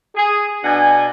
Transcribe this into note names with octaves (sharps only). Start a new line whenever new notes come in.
G#4
B2 D4 F#5 G#5